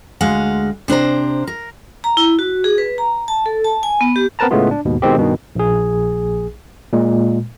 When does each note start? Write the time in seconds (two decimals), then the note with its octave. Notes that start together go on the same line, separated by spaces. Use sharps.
0.21 D2 G#3 F5 F#5
0.88 C3 D4 C5 A#5
1.47 A#4
2.04 A#5
2.17 E4
2.39 F#4
2.64 G#4
2.78 B4
2.98 A#5
3.28 A5
3.46 A4
3.64 A5
3.83 G#5
4.01 B3
4.16 G4
4.39 B3 C4 A#4 B4 A5 A#5
4.51 A2 C#3 G#3 A3 B3 F4
4.71 D4
4.85 D#2 G#2 B2
5.02 B2 D#3 G#3 C4 G4
5.18 G2 B2 D#3
5.55 A#1 G#4
6.93 A#2 G#3